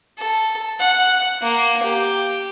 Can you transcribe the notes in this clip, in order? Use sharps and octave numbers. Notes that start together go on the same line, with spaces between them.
A4
F#5
A#3
G4